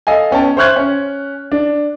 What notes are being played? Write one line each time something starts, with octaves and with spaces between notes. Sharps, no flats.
A4 D#5 F5 G#5
B3 C#4 G5 A5
C5 E5 C#6 F6 F#6 G#6
C#4
D4